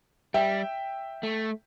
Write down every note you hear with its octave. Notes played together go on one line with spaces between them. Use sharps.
G3 E5 G5
A3